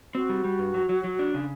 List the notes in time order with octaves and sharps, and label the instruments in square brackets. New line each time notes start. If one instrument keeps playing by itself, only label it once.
[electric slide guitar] C4 [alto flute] F#4
[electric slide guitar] G3
G3
G2
F#3
F#3
F#3
D4
C#3